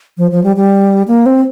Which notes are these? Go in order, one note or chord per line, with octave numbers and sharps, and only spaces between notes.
F3
F3
G3
G3
A#3
C4